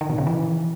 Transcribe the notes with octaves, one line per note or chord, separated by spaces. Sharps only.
D#3
B2
C#3
E3